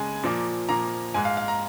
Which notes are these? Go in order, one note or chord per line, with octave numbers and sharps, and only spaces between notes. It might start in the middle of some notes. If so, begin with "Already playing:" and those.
Already playing: C#3 G#3 G#5
A#2 F3 A#3
A#2 F3 A#3 A#5
G#2 G#3 G#5
F5
F5
A#5